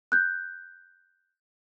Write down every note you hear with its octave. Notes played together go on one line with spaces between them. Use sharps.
F#6 G6